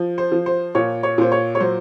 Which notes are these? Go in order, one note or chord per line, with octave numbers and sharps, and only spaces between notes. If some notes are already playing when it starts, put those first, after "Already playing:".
Already playing: F3
C5
F3
C5
A#2 C#5
C#5
A#2 C5
C#5
C#5
F#3 C5